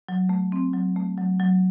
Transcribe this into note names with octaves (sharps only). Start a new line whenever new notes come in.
F#3
A3
C4
F#3
A3
F#3
F#3